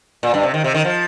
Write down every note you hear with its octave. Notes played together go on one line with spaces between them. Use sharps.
A#2
G2
C3
D#3
C3
D#3
F3